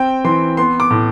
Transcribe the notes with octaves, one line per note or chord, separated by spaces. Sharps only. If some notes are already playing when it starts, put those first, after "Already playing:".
Already playing: C4 G5
E3 C6
B3 C6
D6
A2